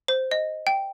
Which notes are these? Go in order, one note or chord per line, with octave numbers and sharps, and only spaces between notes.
C5
D#5
G5